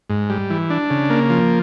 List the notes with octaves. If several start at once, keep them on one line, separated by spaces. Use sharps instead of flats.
G#2
G3
E3
D4
C#3
A#3
F3